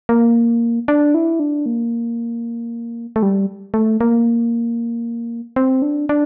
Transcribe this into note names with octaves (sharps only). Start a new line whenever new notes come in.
A#3
D4
E4
D4
A#3
A3
G3
A3
A#3
C4
D4
D4